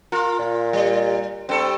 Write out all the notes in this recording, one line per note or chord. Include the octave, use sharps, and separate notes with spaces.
F4 A#4
A#2
G3
G2 C4 A4